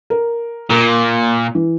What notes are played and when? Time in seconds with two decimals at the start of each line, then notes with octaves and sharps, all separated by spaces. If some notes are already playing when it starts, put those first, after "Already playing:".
0.10 A#4
0.70 A#2 A#3
1.55 E3